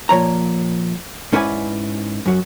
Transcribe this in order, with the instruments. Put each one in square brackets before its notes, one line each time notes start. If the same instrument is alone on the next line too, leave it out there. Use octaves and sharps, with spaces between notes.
[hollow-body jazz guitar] A#2 F3 C#5 A#5
G#2 C#4 E4 B4 D5 G#5
F#2 F#3